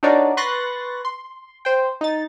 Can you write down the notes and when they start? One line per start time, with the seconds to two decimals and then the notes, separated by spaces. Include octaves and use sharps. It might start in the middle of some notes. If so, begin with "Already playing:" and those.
0.03 D4 D#4 F#4 A#4 C#5 D5
0.37 B4 C6 C#6 F#6 A6 A#6
1.05 C6
1.65 C5 G5
2.01 D#4 A6